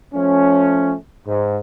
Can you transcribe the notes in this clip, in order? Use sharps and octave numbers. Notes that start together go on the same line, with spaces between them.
F3 A3 C#4
G#2